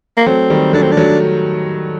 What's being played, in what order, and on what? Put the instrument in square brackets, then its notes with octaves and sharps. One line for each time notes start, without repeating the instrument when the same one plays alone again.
[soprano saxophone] A#3
[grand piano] F#3 A3 [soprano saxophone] C4
[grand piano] D#3 G3
[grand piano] F#3 A3 [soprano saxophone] D4
[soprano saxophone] C4
D4
[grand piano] F#3 A3